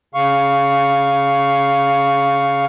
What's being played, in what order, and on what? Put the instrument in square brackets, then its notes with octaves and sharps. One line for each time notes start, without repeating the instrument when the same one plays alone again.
[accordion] C#3 F5 C#6